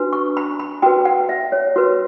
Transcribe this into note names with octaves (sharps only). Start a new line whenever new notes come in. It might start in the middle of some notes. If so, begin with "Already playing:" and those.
Already playing: D4 F#4 B4
C#6
B5
B5
F#4 B4 G5
F#5
E5
C#5
F#4 B4